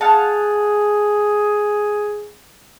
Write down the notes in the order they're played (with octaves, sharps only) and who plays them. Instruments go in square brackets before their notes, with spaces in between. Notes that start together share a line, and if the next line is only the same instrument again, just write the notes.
[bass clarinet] G#4 [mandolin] F5 F#5 A5